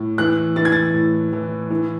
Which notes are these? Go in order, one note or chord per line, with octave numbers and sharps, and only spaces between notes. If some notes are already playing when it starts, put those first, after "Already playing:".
Already playing: A2
E3 F#6
E3 A6
G#6
A6
A2
E3
E3